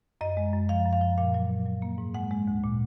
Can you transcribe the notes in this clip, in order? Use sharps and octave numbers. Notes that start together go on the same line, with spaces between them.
F#2 D#5
G#3
F#2
F3 F5
F#2
F5
F3
A#2 F5
F#3
A#2
F#3
A#3
G#2
G#3 F#5
G#3
D2
A#2